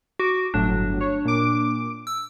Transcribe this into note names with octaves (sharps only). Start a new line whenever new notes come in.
F#4 D6
G1 A2 F#3 D4
C#5
A#2 D6
E6